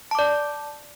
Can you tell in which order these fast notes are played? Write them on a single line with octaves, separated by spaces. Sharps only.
A5 D6 D5